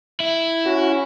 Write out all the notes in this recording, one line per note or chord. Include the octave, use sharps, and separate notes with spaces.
E4
C#4 F#4